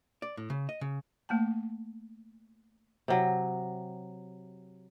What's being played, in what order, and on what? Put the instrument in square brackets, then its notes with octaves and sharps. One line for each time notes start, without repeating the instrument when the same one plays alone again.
[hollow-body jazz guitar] D5
A2
C#3
D#5
C#3
[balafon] A3 A#3 G5 A5
[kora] C3 F#3